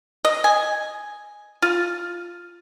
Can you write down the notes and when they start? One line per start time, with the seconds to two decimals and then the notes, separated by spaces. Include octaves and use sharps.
0.25 D#5
0.44 G#5
1.62 F4